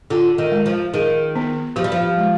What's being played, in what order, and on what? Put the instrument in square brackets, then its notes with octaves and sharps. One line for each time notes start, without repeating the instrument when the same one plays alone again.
[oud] D3 [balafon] F4
[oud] D#3
[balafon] G#3
[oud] F3
[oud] D#3 [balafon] G#4
[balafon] B3
[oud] F3 [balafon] G4
[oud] G3
F3
[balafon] G#3